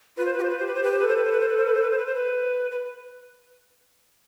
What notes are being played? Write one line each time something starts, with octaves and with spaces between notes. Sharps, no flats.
F4 B4
C5
B4
G4
F4 C5
B4
G4 C5
B4
C5
G4 B4
C5
B4
A4
C5
B4
C5
B4
C5
B4
C5
B4
C5
B4
C5
B4
C5
B4
B4